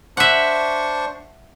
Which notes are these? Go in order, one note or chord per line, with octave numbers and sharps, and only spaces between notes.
D4 C5 E5 F#5 C#6